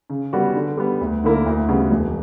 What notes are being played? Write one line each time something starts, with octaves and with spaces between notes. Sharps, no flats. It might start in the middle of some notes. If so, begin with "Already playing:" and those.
C#3
G3 B3 F#4
D3
G3 B3
D2
D3 A#3 E4 A#4
D2
C#3 G3 B3 F#4
E1